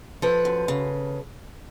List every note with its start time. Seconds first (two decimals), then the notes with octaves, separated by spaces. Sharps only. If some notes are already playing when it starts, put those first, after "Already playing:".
0.22 F3 A4 B4
0.45 F#2
0.68 C#3